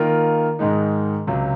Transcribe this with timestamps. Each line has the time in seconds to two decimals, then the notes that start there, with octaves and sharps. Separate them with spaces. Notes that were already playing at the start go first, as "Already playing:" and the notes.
Already playing: D#3 A#3 F4 A#4
0.59 G#2 D#3 G#3 D#4
1.27 C#2 C3 F#3